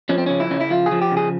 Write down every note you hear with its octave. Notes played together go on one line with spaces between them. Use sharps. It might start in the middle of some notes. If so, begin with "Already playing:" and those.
F3 C#4
C4
C#3 C#4
E4
C#3 C#4
E4
F3 F4
G#4
F3
G4
C#3
G#4